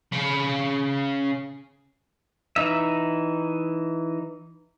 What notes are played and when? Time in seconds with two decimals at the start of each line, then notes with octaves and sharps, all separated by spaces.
0.12 C#3 B5
2.56 E3 D#4 E5